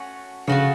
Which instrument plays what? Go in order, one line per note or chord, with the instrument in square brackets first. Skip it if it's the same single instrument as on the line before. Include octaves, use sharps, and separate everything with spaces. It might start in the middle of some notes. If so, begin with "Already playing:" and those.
Already playing: [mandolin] A3 C#4 F#4 C#5
[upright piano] C#3 [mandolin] A3 C#4 F#4 C#5